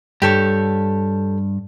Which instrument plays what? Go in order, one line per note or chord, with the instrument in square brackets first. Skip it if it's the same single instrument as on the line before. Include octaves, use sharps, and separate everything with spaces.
[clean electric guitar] G2 [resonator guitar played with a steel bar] G4 A4 C#5